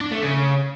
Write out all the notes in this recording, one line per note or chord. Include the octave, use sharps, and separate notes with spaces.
D4
A3
C#3